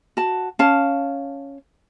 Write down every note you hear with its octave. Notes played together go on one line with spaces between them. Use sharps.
F#4 A5
C#4 F5 A5